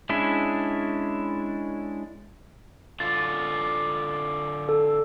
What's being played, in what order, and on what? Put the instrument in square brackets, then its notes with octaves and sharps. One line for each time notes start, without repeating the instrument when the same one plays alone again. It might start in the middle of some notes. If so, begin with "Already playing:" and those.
[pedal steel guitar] G#3 C#4 D4 E4
[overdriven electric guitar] D3 F4 [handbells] A6
[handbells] A4